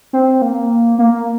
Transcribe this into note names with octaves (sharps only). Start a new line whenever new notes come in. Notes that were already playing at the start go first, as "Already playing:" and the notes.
C4
A#3
A#3